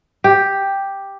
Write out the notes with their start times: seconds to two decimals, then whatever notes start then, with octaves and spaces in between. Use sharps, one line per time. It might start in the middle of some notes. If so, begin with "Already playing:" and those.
0.24 G4